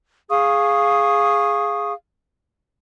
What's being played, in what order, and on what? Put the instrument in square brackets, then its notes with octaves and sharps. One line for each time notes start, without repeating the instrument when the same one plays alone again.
[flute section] G#4 F5 C#6 D#6